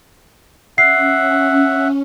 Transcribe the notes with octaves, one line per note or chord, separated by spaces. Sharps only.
C#4 E5 F#5 C7